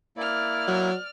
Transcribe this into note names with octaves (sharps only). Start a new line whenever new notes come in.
A#3 E4 D5 F6
F#3